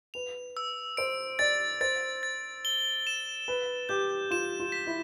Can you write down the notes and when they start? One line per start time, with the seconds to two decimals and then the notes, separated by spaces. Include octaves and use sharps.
0.14 B4 F7
0.57 E6
0.97 C5 D7
1.39 D5 A6
1.81 C5 A6
2.23 A6
2.65 G7
3.07 E7
3.48 B4 G7
3.89 G4 G6
4.31 F4 E7
4.60 F4
4.72 B6
4.87 E4